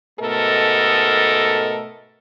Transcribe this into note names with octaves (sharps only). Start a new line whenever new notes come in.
G#2 B2 A3 A4 A#4 D#5